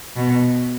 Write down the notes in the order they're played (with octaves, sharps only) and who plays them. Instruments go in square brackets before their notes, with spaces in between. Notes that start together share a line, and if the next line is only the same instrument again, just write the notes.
[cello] B2